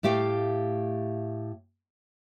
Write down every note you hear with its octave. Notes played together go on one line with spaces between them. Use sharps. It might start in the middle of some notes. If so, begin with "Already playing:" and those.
A2 A3 G4 F5 G5